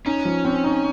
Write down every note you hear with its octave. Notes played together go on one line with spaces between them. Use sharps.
C#4 D#4
F3
C4
D#4